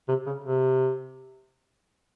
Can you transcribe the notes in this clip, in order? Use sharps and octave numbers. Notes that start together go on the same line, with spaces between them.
C3
C#3
C3